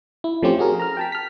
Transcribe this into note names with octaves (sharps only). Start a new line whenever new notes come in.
E4
F3 A3 C4 C#4 G4 C5
F#4 G#4 A#4
A#5 F6
G5 A5 B6
F6 B6